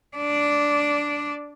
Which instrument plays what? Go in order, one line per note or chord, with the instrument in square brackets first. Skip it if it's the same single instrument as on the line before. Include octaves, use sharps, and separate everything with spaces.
[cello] D4 D5